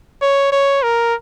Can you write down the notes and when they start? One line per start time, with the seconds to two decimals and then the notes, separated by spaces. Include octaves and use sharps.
0.22 C#5
0.52 C#5
0.83 A#4